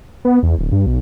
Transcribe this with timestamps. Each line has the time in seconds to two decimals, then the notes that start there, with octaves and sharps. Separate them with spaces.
0.25 B3
0.43 E2
0.59 D1
0.72 G2
0.86 B1